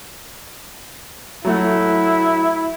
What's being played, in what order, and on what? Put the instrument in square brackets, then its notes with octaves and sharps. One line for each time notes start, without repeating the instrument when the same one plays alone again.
[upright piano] F#3 A3 F#4 [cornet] E4